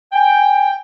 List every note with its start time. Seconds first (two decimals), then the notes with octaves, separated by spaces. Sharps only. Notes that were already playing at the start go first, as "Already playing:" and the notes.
0.13 G5 G#5